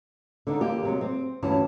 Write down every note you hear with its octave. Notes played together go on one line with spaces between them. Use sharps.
D3 D4 D#4
D#2 A#3 G4
C3 F#3 G#3
C4
D2 G2 E3 C#4 A5